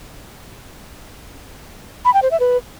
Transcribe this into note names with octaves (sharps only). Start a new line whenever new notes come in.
B5
G5
C5
E5
B4